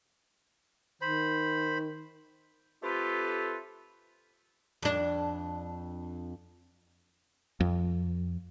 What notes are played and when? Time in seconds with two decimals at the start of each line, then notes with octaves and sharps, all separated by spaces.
1.01 D#3 C5 B5
2.83 A3 C4 F4 G4 A4 B4
4.82 F2 D4
7.60 F2